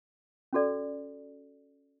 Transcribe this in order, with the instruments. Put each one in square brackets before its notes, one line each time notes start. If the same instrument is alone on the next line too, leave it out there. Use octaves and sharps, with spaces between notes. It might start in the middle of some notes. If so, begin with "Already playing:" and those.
[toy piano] C#4 F#4 A4 D5